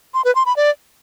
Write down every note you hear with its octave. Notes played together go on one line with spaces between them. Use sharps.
C6
B4
C6
B5
D5